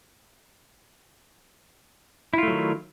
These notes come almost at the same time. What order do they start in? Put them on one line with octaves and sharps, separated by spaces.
E4 F4 A3 F#3 D#3